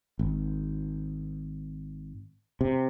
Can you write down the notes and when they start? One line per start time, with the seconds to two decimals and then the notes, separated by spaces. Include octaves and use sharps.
0.19 G#1
2.61 C3